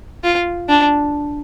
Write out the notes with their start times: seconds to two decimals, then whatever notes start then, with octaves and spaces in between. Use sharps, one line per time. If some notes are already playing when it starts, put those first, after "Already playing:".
0.24 F4
0.69 D4